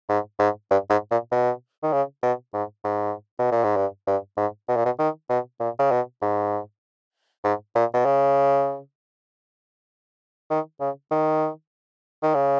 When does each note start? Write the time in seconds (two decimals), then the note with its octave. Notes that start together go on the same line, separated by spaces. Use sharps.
0.09 G#2
0.39 G#2
0.71 G2
0.90 G#2
1.11 A#2
1.32 B2
1.83 D#3
1.92 C#3
2.23 B2
2.54 G#2
2.84 G#2
3.39 B2
3.52 A#2
3.64 G#2
3.77 G2
4.07 G2
4.37 G#2
4.68 B2
4.77 A#2
4.85 B2
4.99 D#3
5.30 B2
5.60 A#2
5.79 C#3
5.91 B2
6.22 G#2
7.44 G#2
7.75 A#2
7.94 B2
8.05 C#3
10.50 D#3
10.80 C#3
11.11 D#3
12.23 D#3
12.34 C#3